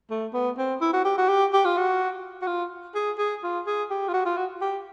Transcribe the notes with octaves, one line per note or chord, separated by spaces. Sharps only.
A3
B3
C4
E4
F#4
G4
F#4
G4
G4
F4
F#4
F#4
F4
G#4
G#4
F4
G#4
G4
F4
F#4
F4
F#4
G4